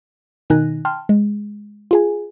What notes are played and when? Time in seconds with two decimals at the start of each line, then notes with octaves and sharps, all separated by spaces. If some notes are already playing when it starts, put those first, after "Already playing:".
0.50 B2 D#3 D#4 G#5 F#6 A#6
0.85 G5 A5 C6 F6
1.09 G#3
1.91 F4 G#4 G#5